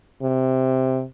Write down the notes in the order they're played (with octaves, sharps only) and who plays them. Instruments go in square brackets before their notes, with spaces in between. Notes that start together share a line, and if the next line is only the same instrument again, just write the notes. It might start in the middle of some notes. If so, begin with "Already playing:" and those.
[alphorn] C3